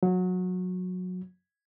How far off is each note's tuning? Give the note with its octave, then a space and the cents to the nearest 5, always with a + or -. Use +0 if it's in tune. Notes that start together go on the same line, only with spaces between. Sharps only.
F#3 -20